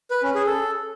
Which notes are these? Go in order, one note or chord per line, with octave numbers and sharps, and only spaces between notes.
B4
C#4
G#4
A4